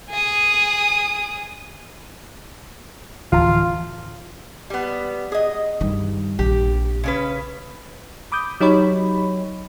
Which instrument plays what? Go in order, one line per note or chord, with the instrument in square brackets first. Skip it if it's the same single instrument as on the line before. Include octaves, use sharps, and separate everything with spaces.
[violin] G#4 D#6
[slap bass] D1 E3 F3 [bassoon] F4
[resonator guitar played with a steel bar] G3 B3
G#4 D#5
[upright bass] G2 D#3
[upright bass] A#1 [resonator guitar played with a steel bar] G4
[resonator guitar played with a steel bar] C#3 C#4 B4
[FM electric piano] B5 D6 D#6 G6
F#3 D#4 G4 C#5 B5